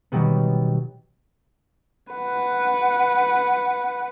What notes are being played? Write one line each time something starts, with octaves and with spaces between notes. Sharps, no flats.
B2 D#3 F#3 G3 B3
B4 F#5